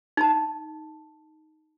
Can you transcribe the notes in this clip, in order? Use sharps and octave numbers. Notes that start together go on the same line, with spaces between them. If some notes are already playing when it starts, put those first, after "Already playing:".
D#4 A5